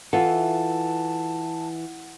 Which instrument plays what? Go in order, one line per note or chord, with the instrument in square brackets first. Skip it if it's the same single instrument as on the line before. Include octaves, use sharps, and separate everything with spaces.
[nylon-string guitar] E3 [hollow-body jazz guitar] F4 A4 [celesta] F#5 [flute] A5